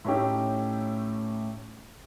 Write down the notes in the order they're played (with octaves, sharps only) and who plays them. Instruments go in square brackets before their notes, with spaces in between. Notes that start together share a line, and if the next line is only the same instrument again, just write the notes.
[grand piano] A2 A3 C#4 D#4 G4